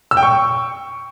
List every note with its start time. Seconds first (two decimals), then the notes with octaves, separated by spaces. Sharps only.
0.11 E6
0.17 G5
0.23 C#6